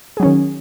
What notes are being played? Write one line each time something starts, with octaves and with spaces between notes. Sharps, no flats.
D#3 F#3 C#4 G#4